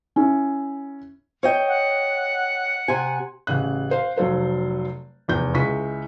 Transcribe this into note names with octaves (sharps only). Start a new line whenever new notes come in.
C#4 E4
C#5 D#5 G5
F#5
C3 G#5
A1 C#3 F#6
C5 F5
F1 F#3 A4 C5 F5
F1 E2 G6
C#2 G#3 E4 C#6 B6